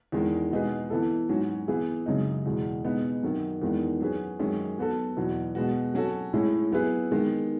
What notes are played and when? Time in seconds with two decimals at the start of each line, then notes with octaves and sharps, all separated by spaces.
0.12 E2 D#3 G#3
0.51 B2 G#3 D#4 G#4 B4
0.90 E3 B3 E4 A4
1.29 G#2 F#3 C#4 F#4
1.68 E3 B3 E4 G#4
2.06 F#2 C#3 G#3 D#4
2.46 E2 B2 G#3
2.84 B2 G#3 B3 D#4 F#4
3.23 F#2 D#3 F#3
3.62 E2 D#3 G#3 B3
4.00 F#3 C#4 G#4 B4
4.39 F#2 D#3 G#3 C#4
4.78 F#3 B3 F#4 A4
5.17 E2 B2 F#3 B3
5.55 B2 G#3 B3 F#4
5.94 F#3 C#4 F#4 A4
6.33 A2 G#3 C#4 E4
6.71 F#3 B3 E4 G#4 B4
7.11 D#3 G#3 B3